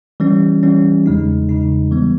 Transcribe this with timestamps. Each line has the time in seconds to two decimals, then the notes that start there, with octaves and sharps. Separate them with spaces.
0.20 E3 G3 C#4
0.63 E3 G3 C#4
1.06 E2 C#3 G#3 D#4
1.49 E2 C#3 G#3 D#4
1.92 E3 G3 B3